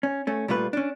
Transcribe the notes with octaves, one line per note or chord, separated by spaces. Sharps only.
C#4
A3 C#4
A#2 G3 A3 F4 B4
C#4 D4